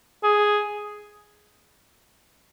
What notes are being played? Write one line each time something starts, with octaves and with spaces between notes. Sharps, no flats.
G#4